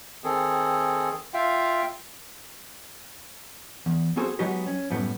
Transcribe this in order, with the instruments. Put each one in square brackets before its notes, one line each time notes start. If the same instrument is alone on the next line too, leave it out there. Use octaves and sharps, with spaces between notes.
[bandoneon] D#3 C4 G#4 A4
F4 E5 F5 G5
[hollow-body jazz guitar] E2
B3 C4 F#4 G#4 A4 C5
F#3 G#3 B3 D#4 F#4 G4
C#4
F#2 A2 G3 B3